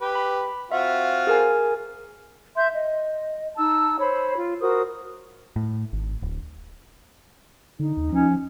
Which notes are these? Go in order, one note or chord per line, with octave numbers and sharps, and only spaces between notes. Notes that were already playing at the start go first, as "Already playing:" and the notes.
G4 B4
B5
C4 F4 F#4 E5
G#4 A#4 G#5
E5 C6 G6
D#5
D#4 A5 E6
C5 C#5 B5
F4
F#4 A#4 C5 D#6
A2
G#1
D1
D3 D#4
D#2
F3 C#4